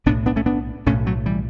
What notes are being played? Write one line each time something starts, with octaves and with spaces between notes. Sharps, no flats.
B1 A2 B3 D4
B3 D4
A3 C#4
B3 D4
B1 A2 A3 C#4
F#3 A3
E3 G3